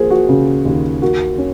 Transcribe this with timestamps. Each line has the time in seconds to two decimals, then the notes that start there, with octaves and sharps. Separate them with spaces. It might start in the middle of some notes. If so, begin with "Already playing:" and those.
Already playing: F3 A#3 G#4 A#4 C5
0.10 F#4
0.29 C#3
0.65 D#2
1.02 A#3 F#4
1.38 C#4